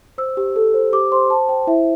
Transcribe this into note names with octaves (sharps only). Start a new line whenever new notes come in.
C5 E6
G4
A4
C5
G4 D6
C5 C6
C5 A5
C5 G5
E4 E5